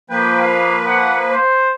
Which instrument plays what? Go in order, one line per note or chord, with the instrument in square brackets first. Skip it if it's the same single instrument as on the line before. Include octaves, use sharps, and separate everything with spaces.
[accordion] F3 A#3 B4 [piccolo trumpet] G5
[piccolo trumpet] F5
F#5
C5